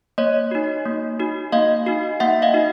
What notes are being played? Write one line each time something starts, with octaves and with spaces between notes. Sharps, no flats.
A#3 C#5 D#5
D#4 F#4
A#3
D#4 F#4
A#3 D#5 F5
D#4 F#4
A#3 E5 F#5
D#5 F5
D#4 F#4